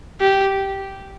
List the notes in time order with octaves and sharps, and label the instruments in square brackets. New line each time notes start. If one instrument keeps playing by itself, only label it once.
[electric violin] G4